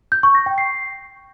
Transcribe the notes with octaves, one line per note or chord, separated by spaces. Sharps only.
G6
C#6
A#6
G5
C7